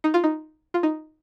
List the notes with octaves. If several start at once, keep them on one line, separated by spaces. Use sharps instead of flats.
D#4
F4
D#4
F4
D#4